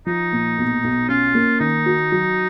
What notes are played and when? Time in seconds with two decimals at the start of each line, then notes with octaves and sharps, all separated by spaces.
0.06 F3 D#4
0.33 A#2
0.58 B1
0.84 B1
1.09 C#4 F4
1.35 A#3
1.60 D#3 D#4
1.86 F#4
2.12 F#3